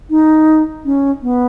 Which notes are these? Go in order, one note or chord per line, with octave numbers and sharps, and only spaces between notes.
D#4
C#4
B3